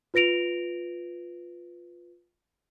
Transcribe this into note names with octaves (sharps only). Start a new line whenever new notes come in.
F4 B4 A#6 D7 F7